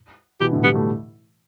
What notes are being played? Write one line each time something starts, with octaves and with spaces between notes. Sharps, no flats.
B2 E3 G4
A2 D3
D3 G3 B3
A3